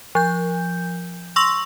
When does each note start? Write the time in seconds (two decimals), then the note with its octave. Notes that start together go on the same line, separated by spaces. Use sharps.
0.15 F3 G6
1.36 C6 C#6 E6 A#6 F7 F#7